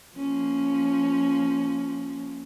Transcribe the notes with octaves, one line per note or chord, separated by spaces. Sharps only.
F3 A#3 C#4